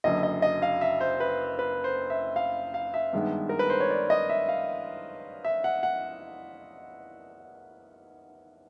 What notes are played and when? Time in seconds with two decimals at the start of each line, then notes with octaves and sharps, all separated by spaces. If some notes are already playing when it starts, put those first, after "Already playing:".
0.04 F#1 F#2 D3 D#5
0.23 D#5
0.42 D#5
0.62 F5
0.81 E5
1.00 C5
1.20 B4
1.59 B4
1.84 C5
2.10 E5
2.36 F5
2.74 F5
2.94 E5
3.13 G2 D#3 G#3 B3
3.49 A#4
3.59 B4
3.70 C5
3.80 C#5
3.90 D5
4.10 D#5
4.29 E5
4.49 F5
5.45 E5
5.64 F#5
5.83 F#5